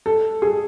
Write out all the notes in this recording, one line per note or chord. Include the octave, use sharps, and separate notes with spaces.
A4
G#4